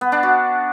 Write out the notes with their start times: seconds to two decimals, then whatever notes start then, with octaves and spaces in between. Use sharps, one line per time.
0.01 B3
0.12 D4
0.23 F#4